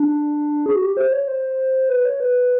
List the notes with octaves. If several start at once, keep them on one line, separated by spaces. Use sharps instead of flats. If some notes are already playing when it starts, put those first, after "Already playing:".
Already playing: D4
G#4
F#4
G4
C5
C#5
C5
B4
C#5
B4